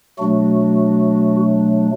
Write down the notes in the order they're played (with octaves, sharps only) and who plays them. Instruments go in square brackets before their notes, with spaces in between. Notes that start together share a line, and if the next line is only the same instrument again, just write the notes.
[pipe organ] B2 F#3 A3 D4 F#4